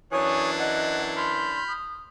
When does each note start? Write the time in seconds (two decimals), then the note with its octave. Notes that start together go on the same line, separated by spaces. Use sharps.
0.12 F#2 E3 D4 C#5 G#5 D#6
0.60 D#5 F#5
1.17 B5 C6 F6 G6
1.68 D#6